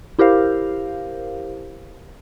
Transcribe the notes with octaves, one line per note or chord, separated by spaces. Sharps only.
E4 G4 A#4 C5 F5